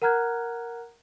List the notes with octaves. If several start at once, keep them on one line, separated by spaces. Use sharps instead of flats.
A#4 F#5 A#5 F6 F#6 G#6